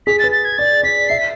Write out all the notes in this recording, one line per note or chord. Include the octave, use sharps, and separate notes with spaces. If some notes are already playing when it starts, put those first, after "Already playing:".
G#4 B6
A6
B4
A6
G#6
D5 A6
D5 B6
E5 C7
B6